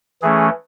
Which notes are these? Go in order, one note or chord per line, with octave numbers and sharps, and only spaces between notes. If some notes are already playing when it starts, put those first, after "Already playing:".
E3 A3 C#4 G#4